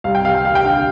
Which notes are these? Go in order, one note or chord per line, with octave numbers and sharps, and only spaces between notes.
C2 F5
G5
C3 F5
G5
D#2 F5
G5
D3 F5